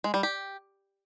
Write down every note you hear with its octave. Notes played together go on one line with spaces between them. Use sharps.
G#3
G3
G4